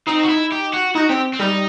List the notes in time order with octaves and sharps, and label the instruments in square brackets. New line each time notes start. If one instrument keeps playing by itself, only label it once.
[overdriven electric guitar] C4 [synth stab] D#4
[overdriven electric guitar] F#4
E4
G4
F#4
[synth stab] D#4 [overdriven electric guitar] F#4
[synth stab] C4 [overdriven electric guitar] G4
[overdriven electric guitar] C4
[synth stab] G3 [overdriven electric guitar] D#4